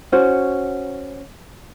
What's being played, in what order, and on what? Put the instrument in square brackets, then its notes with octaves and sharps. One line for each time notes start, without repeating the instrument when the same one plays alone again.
[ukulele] C#4 F#4 C5 F#5